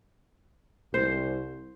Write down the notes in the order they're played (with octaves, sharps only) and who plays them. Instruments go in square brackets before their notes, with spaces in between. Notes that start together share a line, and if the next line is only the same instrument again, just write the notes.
[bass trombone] C2 [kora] C5